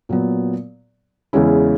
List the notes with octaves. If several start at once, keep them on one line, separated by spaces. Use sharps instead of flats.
A#2 F#3 B3
E2 C#3 G#3 C#4 E4